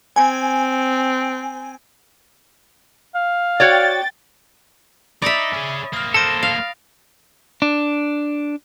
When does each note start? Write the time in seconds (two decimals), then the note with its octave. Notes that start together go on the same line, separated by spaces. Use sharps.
0.16 C4 G#5
3.15 F5
3.60 F#4 C#5 D5 G5 A6
5.22 D#4 D5 E5 B5 D#6 A6
5.53 C#4 G#4
5.93 A#3 C4 D#6 F6
6.14 A4 C5 A6 A#6 D7
6.43 F5
7.62 D4